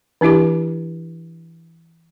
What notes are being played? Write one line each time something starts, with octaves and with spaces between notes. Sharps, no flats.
E3 D4 E4 G4 D6